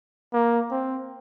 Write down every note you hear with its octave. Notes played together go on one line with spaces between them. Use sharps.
A#3
C4